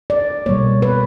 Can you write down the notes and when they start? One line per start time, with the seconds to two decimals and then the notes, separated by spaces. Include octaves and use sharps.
0.10 D5
0.46 B2 G3 A#3 C#5
0.82 B4